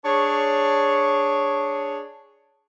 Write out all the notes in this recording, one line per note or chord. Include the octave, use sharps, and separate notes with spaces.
D4 G#4 C#5